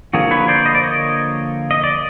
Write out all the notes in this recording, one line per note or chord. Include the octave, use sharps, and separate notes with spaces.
D3 F3 A#3 F#4 G#4
B4 C#5
C5 D5
D#5
D5
C#5 D#5
D#5
D5